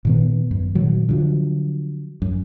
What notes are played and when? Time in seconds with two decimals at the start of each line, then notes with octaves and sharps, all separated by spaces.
0.05 A#2 D#3 B3
0.51 F#2
0.75 A#2 D#3 F#3
1.09 D3 F3 F#3
2.22 F#2